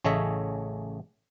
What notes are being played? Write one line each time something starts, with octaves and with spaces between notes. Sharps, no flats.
A1 C#3 A3 C#5 D#5 E5